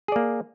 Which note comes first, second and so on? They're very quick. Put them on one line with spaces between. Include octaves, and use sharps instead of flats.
G#4 D5 A#3